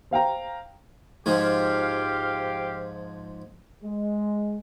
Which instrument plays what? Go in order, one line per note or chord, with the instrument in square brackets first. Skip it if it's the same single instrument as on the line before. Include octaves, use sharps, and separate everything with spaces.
[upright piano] C5 F5 G5 A#5
[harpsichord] G#2 F3 [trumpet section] G4 F5
[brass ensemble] G#3